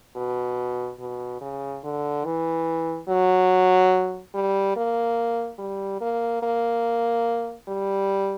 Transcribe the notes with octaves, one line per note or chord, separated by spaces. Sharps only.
B2
B2
C#3
D3
E3
F#3
G3
A#3
G3
A#3
A#3
G3